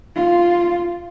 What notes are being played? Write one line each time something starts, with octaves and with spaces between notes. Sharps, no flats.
F4